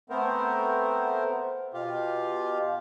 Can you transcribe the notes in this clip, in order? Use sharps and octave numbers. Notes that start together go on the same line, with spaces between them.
A3 B3 C4 A#4 C5
B2 F4 G4 F5